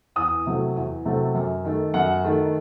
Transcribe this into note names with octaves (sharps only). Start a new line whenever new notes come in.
E2 D#6
C3 F#3 A3
E2
C3 F#3 A3
F#2
D#3 A3
F#2 F#5
D#3 A3